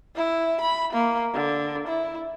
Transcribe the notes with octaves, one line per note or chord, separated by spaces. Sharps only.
E4
B5
A#3
D3
E4